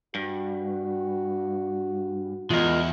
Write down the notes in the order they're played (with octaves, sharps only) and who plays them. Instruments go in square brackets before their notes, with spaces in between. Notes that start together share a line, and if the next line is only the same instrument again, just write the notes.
[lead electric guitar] G2 [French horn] F#4
[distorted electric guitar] E2 [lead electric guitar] G#3 A#4 [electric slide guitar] F4 D#5